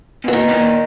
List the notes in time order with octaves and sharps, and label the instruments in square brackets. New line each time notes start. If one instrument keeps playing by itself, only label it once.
[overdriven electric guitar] B2
[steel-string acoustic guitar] E3
[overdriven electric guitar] A#2 [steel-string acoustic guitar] D#3
[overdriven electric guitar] B2
A#2